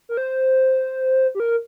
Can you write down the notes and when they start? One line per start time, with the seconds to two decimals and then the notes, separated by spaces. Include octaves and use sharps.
0.09 A#4
0.17 C5
1.35 G4
1.40 A#4